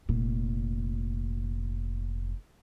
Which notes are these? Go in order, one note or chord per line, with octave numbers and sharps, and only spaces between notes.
F1 A#2